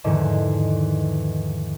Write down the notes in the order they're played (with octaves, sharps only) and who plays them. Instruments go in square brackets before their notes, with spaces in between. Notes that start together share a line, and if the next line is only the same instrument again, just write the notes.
[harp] E2 G#2 D3 D#3 F3